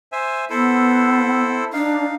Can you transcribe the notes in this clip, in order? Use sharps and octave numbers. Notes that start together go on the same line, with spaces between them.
C5 E5 G#5
B3 E4 A4 C5
D4 D#4 F5